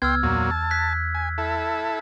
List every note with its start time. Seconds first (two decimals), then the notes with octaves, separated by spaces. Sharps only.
0.02 C#2 B3 G5 C6 E6 F6 G#6
0.23 E2 A#2 F#3
0.51 A5
0.71 F#6 G#6 B6
1.15 G#5
1.38 E4 A4